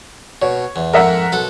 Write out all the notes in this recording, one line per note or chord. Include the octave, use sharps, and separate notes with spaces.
B2 C#5
E2
F2 G#2 A#4 E5 F#5
B1 A4 F#5